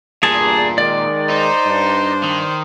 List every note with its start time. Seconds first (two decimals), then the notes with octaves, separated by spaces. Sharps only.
0.23 E2 G2 A#2 G#4 A5
0.78 D#3 G#3 D5
1.30 D#4 C5
1.65 G2 D4
2.23 D#3